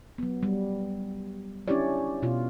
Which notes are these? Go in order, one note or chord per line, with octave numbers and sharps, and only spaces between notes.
F#3 B3
G3
C#4 D4 E4 G4 C#5 D5
B2 F4